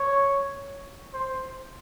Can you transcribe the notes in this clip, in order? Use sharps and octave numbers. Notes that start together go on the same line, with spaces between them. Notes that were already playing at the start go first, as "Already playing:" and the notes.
Already playing: C#5
C5